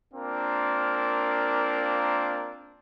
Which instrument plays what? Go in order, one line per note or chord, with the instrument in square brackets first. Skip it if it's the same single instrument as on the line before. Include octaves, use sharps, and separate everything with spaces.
[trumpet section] A#3 C4 D4 F4 A#4